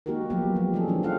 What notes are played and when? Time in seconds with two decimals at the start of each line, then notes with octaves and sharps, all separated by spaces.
0.06 G#3 A#3 D#4 F#4 G4 A#4
0.30 F3 F#3 B3 G4
0.55 F3 G#3 G4
0.73 F3 G3 C4 C#4 G#4 A4
0.88 E3 F3 C#4 D4
1.03 F4 G4 A4 F5 F#5